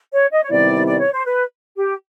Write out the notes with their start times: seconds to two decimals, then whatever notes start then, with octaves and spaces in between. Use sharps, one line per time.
0.12 C#5
0.31 D#5
0.43 C#5
0.50 C3 D#3 G3 B3 E4 D5
0.86 D5
0.99 C#5
1.13 C5
1.25 B4
1.76 G4